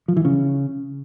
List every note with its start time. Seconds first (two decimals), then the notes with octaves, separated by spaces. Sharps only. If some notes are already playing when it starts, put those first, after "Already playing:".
0.08 F3
0.17 E3
0.25 C#3